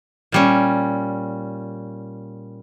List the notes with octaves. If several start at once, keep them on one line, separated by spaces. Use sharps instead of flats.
A#2 G3 C#4